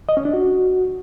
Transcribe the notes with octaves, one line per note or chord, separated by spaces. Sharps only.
D#5
C#4
D4
F#4